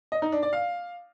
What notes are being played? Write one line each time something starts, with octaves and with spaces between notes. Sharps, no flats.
D#5
D#4
D4
D5
F5